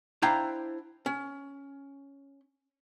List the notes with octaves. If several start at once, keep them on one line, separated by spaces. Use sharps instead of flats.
D4 E4 C5 F5 G5 A#5
C#4